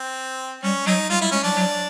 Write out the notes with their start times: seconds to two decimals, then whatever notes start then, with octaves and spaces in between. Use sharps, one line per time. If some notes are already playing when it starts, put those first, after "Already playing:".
Already playing: C4
0.63 G3 C#4
0.86 F#3 D#4
1.10 G3 F4
1.21 G3 E4
1.32 G#3 C#4
1.43 F#3 D4
1.56 F#3